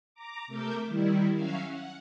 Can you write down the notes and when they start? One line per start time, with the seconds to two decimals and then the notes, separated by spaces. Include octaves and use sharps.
0.14 A#5 D6
0.47 C3 A3 A#4 E5 D6 G6
0.87 D#3 G3 E4
1.33 F#3 C#4 E5 F5
1.68 F#5